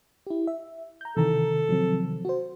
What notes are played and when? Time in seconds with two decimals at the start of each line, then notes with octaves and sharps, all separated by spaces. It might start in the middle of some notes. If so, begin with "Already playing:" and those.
0.27 E4 G4
0.47 E5
1.01 A#5 G6
1.17 C3 D#3 E3 A4 A#5
1.69 F3 F#3 C4
2.25 F#4 C5